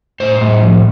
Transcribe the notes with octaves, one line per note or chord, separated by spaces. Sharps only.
A2 C5
A2
F3